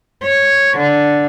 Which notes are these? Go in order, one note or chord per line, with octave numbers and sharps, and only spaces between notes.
C#5
D3